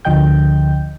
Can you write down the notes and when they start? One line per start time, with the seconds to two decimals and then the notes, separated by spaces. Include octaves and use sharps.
0.05 D2 D3 F3 D#5 G5 G6